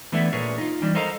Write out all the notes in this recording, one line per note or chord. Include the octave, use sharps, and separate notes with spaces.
E3 A3 B3 D4 E4
A#2 D4 G#4 A#4 B4 C#5
D#4 F4
E3 G3 C#4 D4
A4 A#4 C5 D#5 F5 A#5